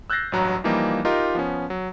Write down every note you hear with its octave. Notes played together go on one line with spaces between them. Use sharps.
E6 F#6 G6 A6 A#6 C7
A1 G2 F#3 A#5 F#6
E3 F3 G3 A#3 D#4
D#4 F4 G4 A#4 D#5
F3 B3 C#4
F#3